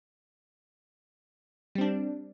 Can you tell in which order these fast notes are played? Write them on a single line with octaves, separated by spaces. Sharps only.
G3 C4 D4